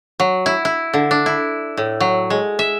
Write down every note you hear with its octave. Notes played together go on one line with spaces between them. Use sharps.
F#3
E4
E4
D3
D4
E4
A2
F#3
G#3
E5